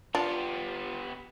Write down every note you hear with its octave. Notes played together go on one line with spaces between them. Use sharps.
B3 D4 F4 G4